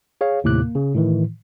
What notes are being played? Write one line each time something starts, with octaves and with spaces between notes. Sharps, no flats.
G#4 C#5 F5
D#2 A2 C3 D6 F#6
A#3
C#3
A2 D#3 E3